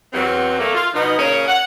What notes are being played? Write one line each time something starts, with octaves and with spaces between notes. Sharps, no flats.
E2 F#3 C4
A3 A#3
F4
B2 F3 B3 D#4
A#2 C#3 A#3 C#4 A#4 C#5
F#5